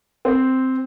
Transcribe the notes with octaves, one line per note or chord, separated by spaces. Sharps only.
C4